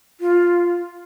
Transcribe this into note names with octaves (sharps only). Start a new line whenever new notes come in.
F4